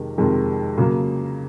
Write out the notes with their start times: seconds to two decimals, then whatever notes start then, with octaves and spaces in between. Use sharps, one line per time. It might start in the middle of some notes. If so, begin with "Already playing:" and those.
Already playing: F2 C3 D#3 G#3
0.18 F2 C3 D#3 G#3
0.78 C#3 F#3 A#3